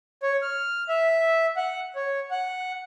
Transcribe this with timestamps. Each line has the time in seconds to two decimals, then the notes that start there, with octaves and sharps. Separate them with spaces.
0.23 C#5
0.42 F6
0.89 E5
1.57 F#5
1.96 C#5
2.31 F#5